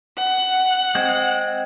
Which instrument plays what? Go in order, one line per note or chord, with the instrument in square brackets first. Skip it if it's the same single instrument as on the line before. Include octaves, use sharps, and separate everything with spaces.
[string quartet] F#5
[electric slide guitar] G#3 C4